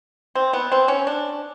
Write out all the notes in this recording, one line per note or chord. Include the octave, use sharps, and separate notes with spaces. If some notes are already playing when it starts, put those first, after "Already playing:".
C4
B3
C4
C#4
D4